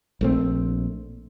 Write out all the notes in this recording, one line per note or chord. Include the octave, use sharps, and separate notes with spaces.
A#1 A3 C4